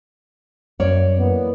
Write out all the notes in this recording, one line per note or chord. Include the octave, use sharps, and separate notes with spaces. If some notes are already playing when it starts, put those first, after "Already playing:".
F#2 C#5 D5
E3 A#3 B3